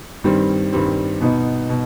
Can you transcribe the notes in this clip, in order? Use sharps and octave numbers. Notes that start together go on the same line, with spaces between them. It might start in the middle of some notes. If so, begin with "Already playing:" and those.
G2 D#3 G3 C4
G2 D#3 G3 C4
B2 B3 D#4
B2